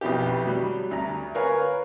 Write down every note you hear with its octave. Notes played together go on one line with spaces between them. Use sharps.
B1 F2 B2 E4 G4
F#3 G3
D2 A#5
A#4 B4 C#5 F5 G#5